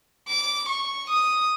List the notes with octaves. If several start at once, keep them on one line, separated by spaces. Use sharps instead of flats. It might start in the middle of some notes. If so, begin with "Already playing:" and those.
D6
C#6
D#6